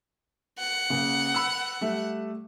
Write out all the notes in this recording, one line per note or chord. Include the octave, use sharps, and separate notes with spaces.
F#5
C#3 A#3
B5 E6
G3 A3 E5